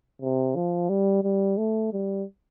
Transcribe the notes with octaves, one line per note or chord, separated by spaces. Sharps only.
C3
F3
G3
G3
A3
G3